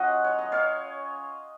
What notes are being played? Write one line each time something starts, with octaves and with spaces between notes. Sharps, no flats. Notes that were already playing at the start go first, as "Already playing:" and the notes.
Already playing: F#3 C#4 F4 D#5 F#5
C#5
D#5
C#5 F5